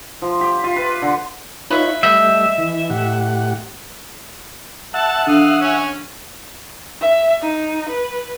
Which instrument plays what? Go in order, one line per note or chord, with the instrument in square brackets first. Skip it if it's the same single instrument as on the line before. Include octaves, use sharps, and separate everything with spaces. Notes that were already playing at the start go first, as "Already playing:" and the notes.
[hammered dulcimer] F3
G4
F4
B4
D3
[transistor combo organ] D#4 F4 C#5 [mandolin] B4 E5
[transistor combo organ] G3 A3 [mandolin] D#5 G6 [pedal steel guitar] E5
[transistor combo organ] E3
A2 G4 F#5
[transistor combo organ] E5 F#5 [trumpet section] A5
[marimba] E3 D4 A4 [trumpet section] F5 D#6
[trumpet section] C#4
[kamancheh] E5
D#4
B4